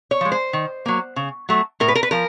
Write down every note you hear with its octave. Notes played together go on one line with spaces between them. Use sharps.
C#5
F3 G#3
C5
D#3
F#3 A#3
C#3
F#3 A3
A2 A#4
B4
A#4
B4
F3 A#4